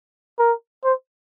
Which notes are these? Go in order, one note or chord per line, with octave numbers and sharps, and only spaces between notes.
A#4
C5